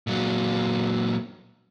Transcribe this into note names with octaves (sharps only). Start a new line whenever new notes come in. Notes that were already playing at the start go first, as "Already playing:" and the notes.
A#2 F#3